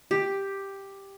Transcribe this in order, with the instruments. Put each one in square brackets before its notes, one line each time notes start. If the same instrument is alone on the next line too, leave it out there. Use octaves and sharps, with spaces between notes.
[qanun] G4